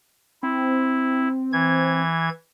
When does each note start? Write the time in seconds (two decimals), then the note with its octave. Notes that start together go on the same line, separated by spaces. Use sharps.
0.43 C4 E4
1.53 E3 G#6